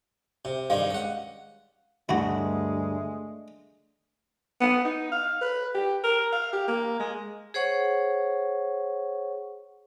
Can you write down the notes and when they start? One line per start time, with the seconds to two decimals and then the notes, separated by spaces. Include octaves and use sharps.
0.45 C3
0.70 G2 D#3 G#3 F5
0.90 C#4 F#5
2.09 D2 G2 G#3 E4 F#4
4.61 B3
4.85 D#4
5.12 F5
5.41 B4
5.75 G4
6.04 A#4
6.33 F5
6.53 G4
6.68 A#3
7.00 G#3
7.54 G#4 C5 C#5 F#5 C#6